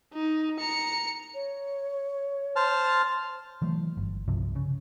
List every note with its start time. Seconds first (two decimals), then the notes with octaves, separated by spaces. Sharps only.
0.14 D#4
0.60 A#5 C#7
1.35 C#5
2.56 C5 A5 F6
3.62 E3 F#3 A3
3.97 G1
4.28 C2 G2 C3 F3
4.55 C#3